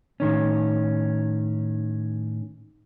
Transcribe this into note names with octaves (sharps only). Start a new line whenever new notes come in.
A2 D#3 C#4